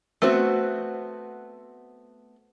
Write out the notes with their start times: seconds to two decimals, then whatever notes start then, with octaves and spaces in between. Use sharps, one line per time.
0.22 A3 B3 C4 F#4